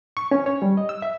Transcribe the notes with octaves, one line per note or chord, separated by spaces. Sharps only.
C#6
C#4
C#5
G3
D#5
E6
E5